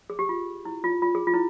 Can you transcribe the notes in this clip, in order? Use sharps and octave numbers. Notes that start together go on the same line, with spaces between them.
G#4
G4
F4
E4
F4
F4
G#4
F4
E4